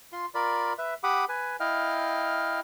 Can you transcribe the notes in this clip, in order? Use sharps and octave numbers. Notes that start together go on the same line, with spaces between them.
F4 C6
F4 A#4 D5 B5
B4 E5
G4 F#5 B5 D6 D#6
B4 G#5
E4 D#5 F5 G5 F6